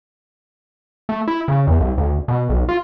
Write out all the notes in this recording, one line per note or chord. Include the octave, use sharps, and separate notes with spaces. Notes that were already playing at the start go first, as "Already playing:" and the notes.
A3
E4
C#3
E2
C2
D2
B2
B1
F4